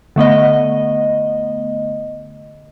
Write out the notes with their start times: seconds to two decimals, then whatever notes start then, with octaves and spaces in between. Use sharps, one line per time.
0.16 D3 A3 B3 D#5